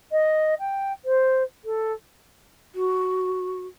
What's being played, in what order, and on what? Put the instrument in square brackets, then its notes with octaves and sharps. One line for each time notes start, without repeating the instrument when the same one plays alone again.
[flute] D#5
G5
C5
A4
[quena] F#4